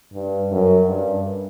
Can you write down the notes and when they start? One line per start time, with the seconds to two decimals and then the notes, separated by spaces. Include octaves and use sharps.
0.13 G2
0.51 F#2
0.88 G2